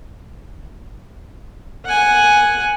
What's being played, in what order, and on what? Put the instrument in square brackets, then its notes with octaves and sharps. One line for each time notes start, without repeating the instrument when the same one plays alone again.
[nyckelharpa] F#5 G#5